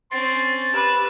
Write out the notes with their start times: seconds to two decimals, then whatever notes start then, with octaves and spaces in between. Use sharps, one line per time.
0.12 C4 C#4 C6 A6
0.74 G4 B4 E6